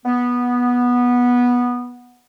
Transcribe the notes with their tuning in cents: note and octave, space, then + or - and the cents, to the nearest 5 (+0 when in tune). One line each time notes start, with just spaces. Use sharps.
B3 -10